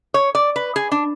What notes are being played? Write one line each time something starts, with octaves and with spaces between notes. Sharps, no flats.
C#5
D5
B4
G#4
D4